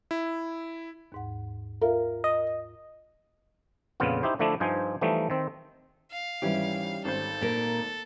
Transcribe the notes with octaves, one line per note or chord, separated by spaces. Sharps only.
E4
D#2 G#2 F#5
F4 A#4 E5 F5
D#5
F2 A#2 C#3 B3 F4
D#4 E4 G4 C5
D3 F3 A3 D4 E4
G2 F3 D#4 C5 G#5
E3 F3 G3 A3 D#4
D#3 C4
F5
G#1 E3 G3 C#4 G4 E5
G#1 A4 C5 G6
A#2 A#4